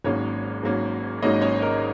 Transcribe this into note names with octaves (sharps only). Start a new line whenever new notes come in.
G#1 G#2 F#3 A#3 C#4 C#5
G#1 G#2 F#3 A#3 C#4
G#1 G#2 F#3 A#3 C#4 D#4 D#5
C#4 C#5
A#4